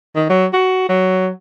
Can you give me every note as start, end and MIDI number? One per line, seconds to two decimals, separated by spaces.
0.16 0.26 51
0.30 0.47 54
0.53 0.86 66
0.89 1.30 54